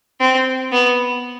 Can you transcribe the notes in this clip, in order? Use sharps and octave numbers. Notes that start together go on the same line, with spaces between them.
C4
B3